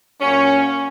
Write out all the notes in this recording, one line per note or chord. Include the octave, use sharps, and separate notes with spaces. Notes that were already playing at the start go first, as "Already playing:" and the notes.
A#2 F#3 C#4